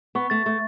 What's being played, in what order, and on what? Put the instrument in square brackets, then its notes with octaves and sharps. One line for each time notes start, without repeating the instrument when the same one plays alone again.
[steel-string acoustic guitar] B3 [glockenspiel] C#6
[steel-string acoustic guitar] A3 [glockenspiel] A6
[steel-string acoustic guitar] A3 [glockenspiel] C#6